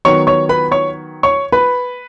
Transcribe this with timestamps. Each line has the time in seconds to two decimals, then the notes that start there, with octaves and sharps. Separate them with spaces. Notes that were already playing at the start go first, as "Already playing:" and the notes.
0.05 D#3 F#3 B3 C#5 C#6
0.27 C#5 C#6
0.49 B4 B5
0.72 C#5 C#6
1.23 C#5 C#6
1.52 B4 B5